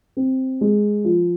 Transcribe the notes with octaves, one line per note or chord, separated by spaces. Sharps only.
C4
G#3
F3